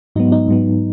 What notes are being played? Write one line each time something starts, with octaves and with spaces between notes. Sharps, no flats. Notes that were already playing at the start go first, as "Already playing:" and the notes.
G#2 F#3 B3 D#4
D#4
G#2 F#3 B3